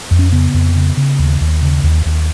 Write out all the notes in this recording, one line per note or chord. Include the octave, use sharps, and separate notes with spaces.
F2
C#4
C#3 B3
F2
C#3
C#3
D#2
D#2
C#3
D#2
D#2